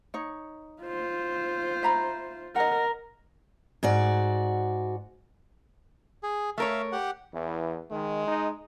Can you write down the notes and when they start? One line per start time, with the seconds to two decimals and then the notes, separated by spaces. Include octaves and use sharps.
0.14 D#4 C#5
0.82 F4 C5
1.83 E5 A#5 B5
2.56 A#4 D#5 F#5
3.83 G#2 F#4 D5
6.23 G#4
6.58 A3 A#4 C#5 E5 F5
6.92 G4 F#5
7.34 E2 E3
7.91 D#3 G#3
8.27 D#4